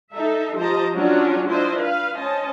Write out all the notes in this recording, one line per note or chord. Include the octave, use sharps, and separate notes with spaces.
D#4 A4 E5
F3 G4 C5 D#5 A5 A#5
F#3 C#4 D4 F4 F#4
D4 E4 F4 C5 D#5
B4 F5
C#4 C5 D#5 A5